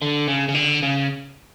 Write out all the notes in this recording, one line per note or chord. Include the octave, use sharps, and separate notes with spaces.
D3
C#3
C#3
D3
C#3